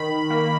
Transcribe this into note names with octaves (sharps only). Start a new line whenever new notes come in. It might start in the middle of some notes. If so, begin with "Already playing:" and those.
Already playing: D#3 B5
A#3